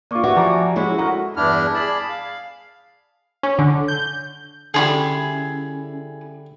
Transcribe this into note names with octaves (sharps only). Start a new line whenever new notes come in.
A#3 F4 D5 C#6 D6
F#4 G4 B4 E5
F3 D5 G#5 A#5 D6
G#3 C#4 E4 F#4
A4 A#4 F#5 A#5 C#6
E2 G2 D4 E4 F6
G#4 D5 A5 B5
F5
C#4
D3
G6
D3 G3 C#4 E4 F4 G#4